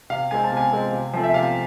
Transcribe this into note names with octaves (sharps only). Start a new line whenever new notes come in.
C3 F5
G#3 C4 G#5
A5
C3 G#5
G#3 C4
C3
F3 A3 C4
E5
C3 F5